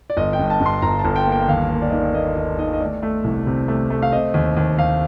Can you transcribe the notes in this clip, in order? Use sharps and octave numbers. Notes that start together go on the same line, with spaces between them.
D5
G1 D#5
G5
G2
A5
G2
C6
G1 A#5
A5
G1
G5
A#3
G5
G5
D#2 F5
A#3
D5
D#3 D#5
D5
A#3 D#5
D#2 D#5
D#3 D#5
D#5
A3 D5
A3
C2
C3
A3
A3
F5
C4 D#5
D#2
D#2
D#2 F5